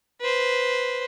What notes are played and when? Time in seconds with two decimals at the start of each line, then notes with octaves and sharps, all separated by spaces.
0.21 B4 C5